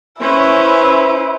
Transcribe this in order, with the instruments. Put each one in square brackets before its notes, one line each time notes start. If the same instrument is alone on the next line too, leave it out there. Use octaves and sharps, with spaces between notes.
[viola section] C#4 B4 C5 [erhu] E4